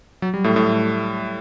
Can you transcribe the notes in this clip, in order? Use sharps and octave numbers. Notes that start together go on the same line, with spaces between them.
F#3
G3
A2 A3
A2 A3